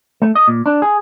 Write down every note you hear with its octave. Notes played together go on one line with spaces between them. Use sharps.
A3
D#5
A#2
D4
G#4